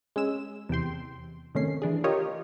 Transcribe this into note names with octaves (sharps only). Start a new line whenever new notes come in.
G#3 C#4 E6 E7
E2 C3 G5 C6
C3 D#3 A3 C#4 C7
E3 D4 G#4
F4 G4 A#4 C#5 D#5